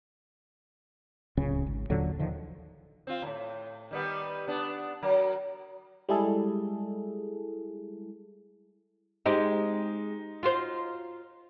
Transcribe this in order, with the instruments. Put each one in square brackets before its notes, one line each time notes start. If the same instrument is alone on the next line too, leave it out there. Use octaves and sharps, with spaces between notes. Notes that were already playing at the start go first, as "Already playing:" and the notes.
[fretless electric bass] D1 C#2 C#3 C#4
G#1
D#2 A#2 D3 F#3
D3 D#3 F3
[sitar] C4 F4
D#2 A2
D#3 G3 B3
B3 D4
F#3 A#4
[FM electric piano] G3 G#3 E4 G#4 A4
[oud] G#3 C4 G4 [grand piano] D#4
[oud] F4 F#4 C5